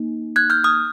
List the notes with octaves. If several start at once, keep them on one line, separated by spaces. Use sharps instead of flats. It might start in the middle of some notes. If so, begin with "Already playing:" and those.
Already playing: A#3 D#4
F#6 G#6
F6 G6
D#6 F6